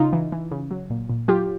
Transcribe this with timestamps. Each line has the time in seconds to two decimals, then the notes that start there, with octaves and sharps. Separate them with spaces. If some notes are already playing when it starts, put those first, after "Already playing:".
Already playing: C#3 D#4 F4
0.13 E3
0.32 E3
0.52 C#3
0.71 F#3
0.90 A#2
1.10 A#2
1.28 F#3 F4 G4